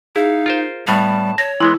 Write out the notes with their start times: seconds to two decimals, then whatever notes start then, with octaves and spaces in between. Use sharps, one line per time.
0.16 D#4 E4 G#4 F5
0.46 F4 A#4 C5
0.87 A2 G3 B3 F5 A5
1.38 C#5 A#6
1.60 E3 G#3 B3 E4 C6